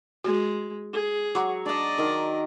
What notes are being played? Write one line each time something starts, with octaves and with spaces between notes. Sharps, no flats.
G#3 F#4
G#4
F#3 C#5 D6
D4 D5 D#5 A5
D#3 A#4